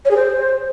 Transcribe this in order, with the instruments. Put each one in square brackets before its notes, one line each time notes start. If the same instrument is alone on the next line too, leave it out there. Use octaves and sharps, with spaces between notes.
[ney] C#5
G#4
C5